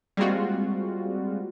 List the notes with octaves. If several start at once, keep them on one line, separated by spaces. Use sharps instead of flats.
G3 G#3 A#3 C4 F4 F#4